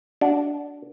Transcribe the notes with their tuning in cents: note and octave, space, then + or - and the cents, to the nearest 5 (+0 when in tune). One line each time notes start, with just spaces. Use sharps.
D4 -15 F#4 +0